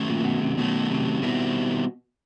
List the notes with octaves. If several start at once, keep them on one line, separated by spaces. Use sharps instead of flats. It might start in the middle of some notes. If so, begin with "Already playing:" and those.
Already playing: D#3 F#3 A3 C#4
A#2
B2
C3
B2 D#3 F#3 A3 C#4
C3
B2 D#3 G3 C4 E4